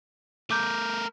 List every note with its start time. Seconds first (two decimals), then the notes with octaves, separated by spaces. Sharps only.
0.51 A3 A#4 D6 G6